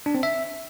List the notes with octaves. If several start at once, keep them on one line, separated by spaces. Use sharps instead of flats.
D4
C4
E5